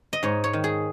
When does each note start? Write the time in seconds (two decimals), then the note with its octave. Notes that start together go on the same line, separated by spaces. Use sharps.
0.13 D#5
0.23 G#2 C#5
0.44 C#5
0.53 D#3
0.64 G#4